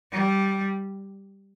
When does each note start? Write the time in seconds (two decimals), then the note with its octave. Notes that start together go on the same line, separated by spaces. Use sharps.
0.12 G3